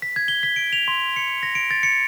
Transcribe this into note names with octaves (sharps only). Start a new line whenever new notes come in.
B6
G#6
G7
B6
D7
F7
C6
C#7
A#6
D7
A6
C#7